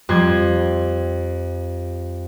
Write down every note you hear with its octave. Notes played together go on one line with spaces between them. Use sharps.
F2 G3 F4 G#6